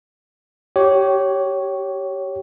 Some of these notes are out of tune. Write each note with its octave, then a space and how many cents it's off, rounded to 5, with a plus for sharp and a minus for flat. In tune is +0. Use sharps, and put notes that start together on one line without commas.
G4 -20 C#5 +0